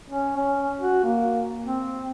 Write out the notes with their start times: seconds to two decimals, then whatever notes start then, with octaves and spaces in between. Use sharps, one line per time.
0.10 C#4
0.36 C#4
0.80 F#4
1.04 A#3
1.65 C4